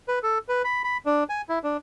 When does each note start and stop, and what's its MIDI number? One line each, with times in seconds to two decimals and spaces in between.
0.08 0.19 71
0.23 0.38 69
0.49 0.62 71
0.64 0.84 83
0.84 0.97 83
1.06 1.24 62
1.29 1.42 80
1.49 1.59 64
1.64 1.77 62